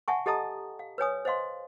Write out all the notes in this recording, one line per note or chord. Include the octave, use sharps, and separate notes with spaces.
E5 F#5 G#5 A5 C#6
G4 A4 D#5 A5 A#5 D#6
F5
B4 C#5 G#5 D#6
C5 D#5 F5 C6